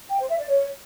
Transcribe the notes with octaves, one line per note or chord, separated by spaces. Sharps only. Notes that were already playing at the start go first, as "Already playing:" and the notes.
G5
C5
E5
D5
C#5